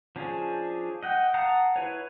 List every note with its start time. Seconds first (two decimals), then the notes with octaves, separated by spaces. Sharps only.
0.16 F3 C#4 D4 G#4
1.03 D#5 F#5 G5
1.34 F5 F#5 A5 A#5 D#6
1.76 E4 B4 C#5